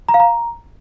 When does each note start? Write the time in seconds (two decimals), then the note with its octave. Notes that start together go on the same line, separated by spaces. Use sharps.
0.09 A#5
0.14 F5
0.20 A#5